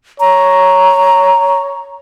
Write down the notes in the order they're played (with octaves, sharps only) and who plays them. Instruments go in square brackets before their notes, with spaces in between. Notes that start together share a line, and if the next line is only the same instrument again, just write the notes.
[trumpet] C#5 [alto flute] A#5